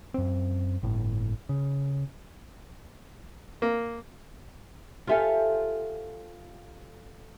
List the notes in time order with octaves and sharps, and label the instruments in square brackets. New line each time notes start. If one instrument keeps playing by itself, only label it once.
[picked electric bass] F#2 C4
G1 A2
C#3
[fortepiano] A#3
[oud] F4 G4 A4 [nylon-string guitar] C5 E5 G#5